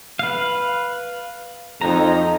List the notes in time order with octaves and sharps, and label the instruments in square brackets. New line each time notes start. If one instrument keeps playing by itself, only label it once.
[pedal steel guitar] B4 F5
[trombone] F2 [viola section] D#4 [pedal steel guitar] A#5